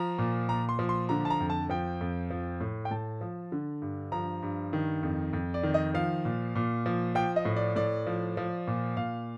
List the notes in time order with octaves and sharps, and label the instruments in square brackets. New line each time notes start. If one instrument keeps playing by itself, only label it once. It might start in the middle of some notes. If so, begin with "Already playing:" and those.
Already playing: [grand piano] F3 A#5
A#2
A#2 A#5
C6
F3
C6
D3 A#5
A5
A#5
F2
A5
F3 G5
F2
F3
A2
G5
A2 A5
F3
D3
G2
F3 A#5
G2
D#3
F2
F2
D5
D#3
D#5
F3 F5
A#2
A#2
F3
F3 G5
D#5
A2
D5
A2 D5
F3
F3
A#2
A#2 F5